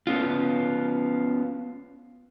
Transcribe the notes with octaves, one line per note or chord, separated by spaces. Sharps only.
B3 C#4 F4